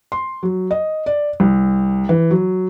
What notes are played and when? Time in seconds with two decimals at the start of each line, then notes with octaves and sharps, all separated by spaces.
0.12 C6
0.43 F#3
0.71 D#5
1.06 D5
1.40 C2
2.09 E3
2.31 F#3